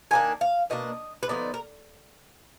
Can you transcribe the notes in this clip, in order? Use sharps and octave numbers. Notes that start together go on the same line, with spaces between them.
D#3 A#3 D4 G#5
F5
B2 A#3 D4 D#5
B4
D3 F3 B3 D#4 D5
A#4